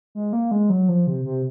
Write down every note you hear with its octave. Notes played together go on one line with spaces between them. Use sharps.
G#3
A#3
G#3
F#3
F3
C3
C3